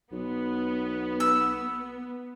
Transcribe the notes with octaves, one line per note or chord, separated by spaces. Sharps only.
B1 B3
E6